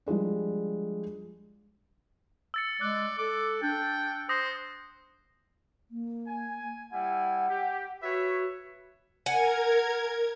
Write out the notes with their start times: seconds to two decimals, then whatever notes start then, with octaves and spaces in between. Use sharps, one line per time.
0.06 F3 G3 G#3 D4
2.54 E6 A6 C#7
2.81 G#3 D5 F#6
3.18 A4 D6
3.63 D4 G5
4.29 C5 D#6 A#6
5.91 A#3
6.27 G#5
6.92 G3 E4 F#5 G#5
7.49 G4
8.03 F#4 B4 C#5 E5
9.26 A#4 F#5 G#5 G#6